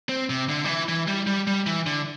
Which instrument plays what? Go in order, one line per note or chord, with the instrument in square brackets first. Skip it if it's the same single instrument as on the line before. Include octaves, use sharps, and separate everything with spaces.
[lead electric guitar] C4
C3
D3
G3
E3
E3
G3
G3
G3
E3
D3